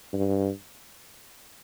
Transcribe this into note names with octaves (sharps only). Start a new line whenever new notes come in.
G2